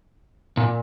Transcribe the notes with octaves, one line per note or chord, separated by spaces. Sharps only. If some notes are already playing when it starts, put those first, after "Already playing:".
A#2